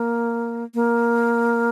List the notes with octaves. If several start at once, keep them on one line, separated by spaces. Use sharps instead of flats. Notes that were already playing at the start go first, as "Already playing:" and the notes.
Already playing: A#3
A#3